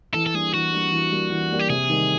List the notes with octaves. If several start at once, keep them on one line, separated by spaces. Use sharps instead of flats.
E3 A4
A4
G3 A#3 D4 G#4
E3 F#4
G3 A#3 D4
E3
G3 A#3 D4
E3
G3 A#3 D4
G4
C3 G#4
D#3 G3